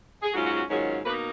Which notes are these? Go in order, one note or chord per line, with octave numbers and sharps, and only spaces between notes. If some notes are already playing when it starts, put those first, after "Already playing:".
G#4
G#2 F#3 C#4 F4 F#4
F#4
F#4
G#2 D#3 F#3 C#4 F4 G#4
B2 A#3 D#4 B4